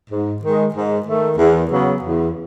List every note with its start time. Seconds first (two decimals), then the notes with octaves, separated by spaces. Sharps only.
0.10 G#2
0.42 D#3 G#3
0.74 G#2
1.06 D#3 A3
1.38 E2
1.70 C#3 F#3 B3
2.03 E2